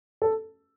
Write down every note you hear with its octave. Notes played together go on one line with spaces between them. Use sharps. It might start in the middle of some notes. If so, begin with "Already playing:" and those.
A4